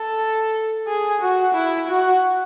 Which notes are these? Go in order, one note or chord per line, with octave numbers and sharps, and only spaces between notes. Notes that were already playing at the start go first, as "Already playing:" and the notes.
Already playing: A4
G#4
F#4
E4
F#4